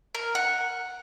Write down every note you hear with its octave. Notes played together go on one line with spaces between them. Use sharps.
A#4
F#5